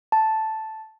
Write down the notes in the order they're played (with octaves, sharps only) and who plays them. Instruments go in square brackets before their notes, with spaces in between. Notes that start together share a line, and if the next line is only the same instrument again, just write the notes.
[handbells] A5